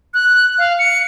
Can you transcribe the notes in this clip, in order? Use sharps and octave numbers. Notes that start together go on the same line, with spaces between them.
F#6
F5
C#7